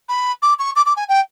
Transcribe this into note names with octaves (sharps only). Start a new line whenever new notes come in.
B5
D6
C#6
D6
D6
G#5
G5